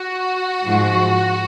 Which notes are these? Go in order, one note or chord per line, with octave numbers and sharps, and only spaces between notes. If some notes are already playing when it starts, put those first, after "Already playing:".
Already playing: F#4
G#2 F3